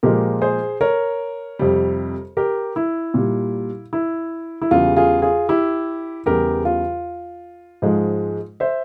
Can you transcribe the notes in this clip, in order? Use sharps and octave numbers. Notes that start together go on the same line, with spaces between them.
A#2 F3 G#3 G4 A#4
G#4 C5
A#4 C#5
F2 C3 G3
G4 A#4
E4
A#2 G3
E4
E4
E2 C#3 G3 F4
F4 G#4
F4 G#4
E4 G4
E2 C#3 G3 G4 A#4
F4
G#2 F3 G#3
C5 E5